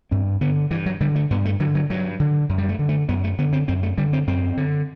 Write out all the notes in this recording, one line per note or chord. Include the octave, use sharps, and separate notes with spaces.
G2 C4
D3 B3
G2 E3
F#3
D3 G3
A3
G2 B3
A3
D3 F#3
F#3
G2 F#3
D3
F#2
G3
A3
D3
A3
F#2 B3
A3
D3 B3
C4
F#2 C4
A3
D3 G3
C4
F#2 C4
D3